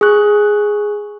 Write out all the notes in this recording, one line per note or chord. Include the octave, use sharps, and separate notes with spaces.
G#4 C#6 F#6